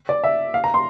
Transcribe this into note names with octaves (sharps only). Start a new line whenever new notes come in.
D5
E5
F5
A#5
C6